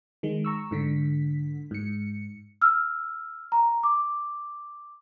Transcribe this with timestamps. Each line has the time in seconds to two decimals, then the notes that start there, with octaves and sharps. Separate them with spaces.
0.23 D#3 G#3
0.45 A#5 C#6 E6
0.71 G#2 D3 B6
1.71 G#2 C#7
2.62 E6 F6
3.52 A#5
3.83 D6